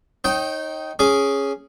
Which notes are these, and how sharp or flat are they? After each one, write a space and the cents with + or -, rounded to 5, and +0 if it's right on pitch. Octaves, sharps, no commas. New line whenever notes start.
D#4 +10 C#5 -30 G5 -20
C#4 +0 G#4 +0 D6 -30